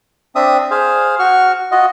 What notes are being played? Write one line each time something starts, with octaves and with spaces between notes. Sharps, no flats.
C4 D4 E5 D#6
G#4 C5 F5
F#4 C#6 F6
F4 F#4 D#5